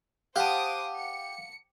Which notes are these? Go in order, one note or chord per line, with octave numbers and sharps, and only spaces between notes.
G4 C5 F5 F#5 A5 D6 D#6
C#7